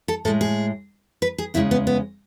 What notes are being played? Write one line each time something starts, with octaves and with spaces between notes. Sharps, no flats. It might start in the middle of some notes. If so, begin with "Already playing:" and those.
A4
A2 G#3 A4
G#4
B4
G#4
E2 C#3 G#3 E4
B3
B3